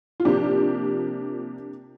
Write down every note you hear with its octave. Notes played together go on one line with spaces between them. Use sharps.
F4
C3 F3 A#3 D4 G4